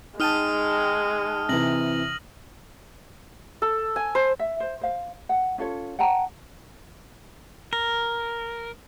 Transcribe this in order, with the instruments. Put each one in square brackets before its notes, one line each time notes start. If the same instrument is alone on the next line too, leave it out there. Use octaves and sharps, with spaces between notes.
[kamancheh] G#3 [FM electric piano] D#4 G5 A5 [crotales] D#6 F6 D#7
[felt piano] C3 E3 [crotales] A#6 F#7
[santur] A4
G#5
C5
[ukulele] E5
C5
C5 F5
F#5
C#4 F4 A4 C#5
F#5 G5 A5 A#5
[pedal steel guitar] A#4